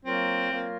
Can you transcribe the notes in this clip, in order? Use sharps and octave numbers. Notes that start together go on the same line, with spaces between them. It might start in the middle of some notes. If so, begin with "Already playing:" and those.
F#3 A#3 C4 F4 A#4
F#3 A#3 F4 A#4